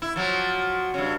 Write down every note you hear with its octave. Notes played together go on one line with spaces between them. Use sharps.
E4
F3 F#3
G2 C#3